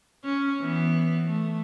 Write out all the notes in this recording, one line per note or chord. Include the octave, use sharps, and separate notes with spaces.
C#4
E3 B3
A3